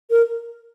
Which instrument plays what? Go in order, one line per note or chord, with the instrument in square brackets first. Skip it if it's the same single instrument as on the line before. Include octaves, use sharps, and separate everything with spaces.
[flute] A#4